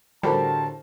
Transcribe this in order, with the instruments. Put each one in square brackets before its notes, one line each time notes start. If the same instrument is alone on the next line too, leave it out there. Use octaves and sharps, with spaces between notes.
[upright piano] A2 D3 G4 [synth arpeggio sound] G3 [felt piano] F#4 A#4 C5 [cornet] A5